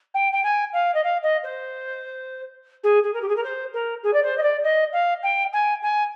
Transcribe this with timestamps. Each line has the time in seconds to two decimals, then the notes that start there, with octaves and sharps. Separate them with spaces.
0.14 G5
0.32 G5
0.44 G#5
0.73 F5
0.94 D#5
1.04 F5
1.23 D#5
1.43 C5
2.83 G#4
3.03 G#4
3.13 A#4
3.22 G4
3.29 G#4
3.36 A#4
3.44 C5
3.73 A#4
4.03 G#4
4.13 D5
4.23 C5
4.38 D#5
4.43 D5
4.63 D#5
4.93 F5
5.23 G5
5.53 G#5
5.83 G#5